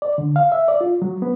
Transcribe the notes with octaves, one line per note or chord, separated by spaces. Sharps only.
D5
D3
F5
E5
D5
F4
F#3
B3